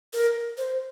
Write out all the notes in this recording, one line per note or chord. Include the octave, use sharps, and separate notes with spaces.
A#4
C5